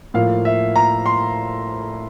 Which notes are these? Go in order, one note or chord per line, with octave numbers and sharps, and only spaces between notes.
A2 F3 A#3 F5
E5
A#5
C6